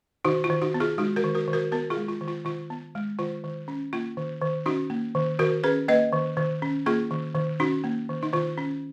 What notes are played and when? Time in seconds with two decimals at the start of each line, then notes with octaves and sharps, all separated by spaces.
0.25 D#3 D#4 F#4
0.44 F4
0.50 D#3
0.62 D#4 F#4
0.74 B3
0.80 F4 G#4
0.98 G#3 D#4 F#4
1.16 F#4 A#4
1.24 D#3
1.35 F#4 A#4
1.48 D#3
1.53 F#4 A#4
1.72 B3 F#4 A#4
1.90 F4 G#4
1.97 G#3
2.09 F4
2.21 D#3
2.28 F4
2.45 D#3 F4
2.70 B3
2.95 G#3
3.19 D#3 F4
3.44 D#3
3.68 C#4
3.93 A#3 F4
4.17 D#3
4.41 D#3
4.66 C#4 D#4 F#4
4.90 A#3
5.15 D#3
5.39 D#3 F#4 A#4
5.64 C#4 G#4 B4
5.88 A#3 B4 D#5
6.12 D#3
6.37 D#3
6.62 C#4
6.86 A#3 F4 G#4
7.11 D#3
7.35 D#3
7.60 C#4 D#4 F#4
7.84 A#3
8.09 D#3
8.23 D#4
8.33 D#3 F4
8.58 C#4